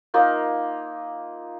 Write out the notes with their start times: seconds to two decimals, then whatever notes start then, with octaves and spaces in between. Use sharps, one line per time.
0.14 A#3 D#4 F4